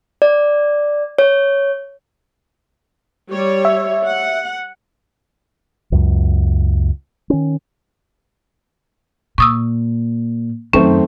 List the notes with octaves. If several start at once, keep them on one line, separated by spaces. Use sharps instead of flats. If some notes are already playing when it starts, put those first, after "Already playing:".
D5
C#5
G3 C#5
E5
F#5
C#2 F#2
D#3 C#4
A#2 C#6 D#6 E6
F#2 D#3 A3 C4 C#4